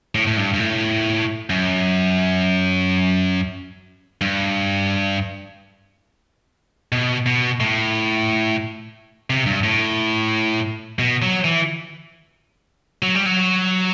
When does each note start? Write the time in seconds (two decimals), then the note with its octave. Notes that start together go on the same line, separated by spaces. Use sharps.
0.15 A2
0.27 A2
0.37 G2
0.54 G2
0.60 A2
1.50 F#2
4.21 G2
6.92 B2
7.26 B2
7.60 A2
9.30 C3
9.46 G2
9.63 A2
10.99 B2
11.22 F#3
11.44 E3
13.03 F#3
13.15 G3
13.26 F#3